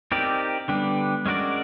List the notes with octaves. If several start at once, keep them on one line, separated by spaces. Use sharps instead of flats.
C4 D#4 G4 A#4 D5
D3 G3 B3 D4 G4
G#3 C#4 F#4 A#4 D5